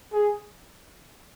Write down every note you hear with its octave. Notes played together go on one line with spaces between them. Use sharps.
G#4